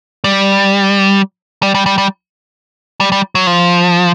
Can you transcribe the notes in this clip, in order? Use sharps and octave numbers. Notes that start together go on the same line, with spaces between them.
G3
G3
G3
G3
G3
G3
G3
F#3
F3